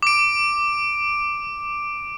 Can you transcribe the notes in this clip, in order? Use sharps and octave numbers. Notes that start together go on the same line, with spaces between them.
D6 D7